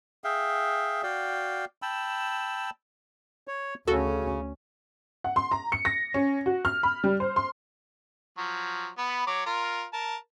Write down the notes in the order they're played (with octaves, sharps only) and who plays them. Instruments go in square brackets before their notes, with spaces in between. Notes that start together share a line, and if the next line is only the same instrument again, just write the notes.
[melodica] G#4 E5 F5 G5
F#4 D5 F5 G5
G5 A5 B5 E6
[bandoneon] C#5
[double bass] D2 C#4 [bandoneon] C#3 [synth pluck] F#4 A4
[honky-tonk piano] F#5
C6
A#5
C#7
A#6
C#4
F#4
F6
B5
G3
C5
C6
[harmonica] F3 F#3
B3 B5
F#3 C#5 D6
F4 A#4
A#4 A5